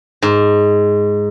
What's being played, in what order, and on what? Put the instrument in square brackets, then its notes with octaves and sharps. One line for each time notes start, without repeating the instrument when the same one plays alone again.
[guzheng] G#2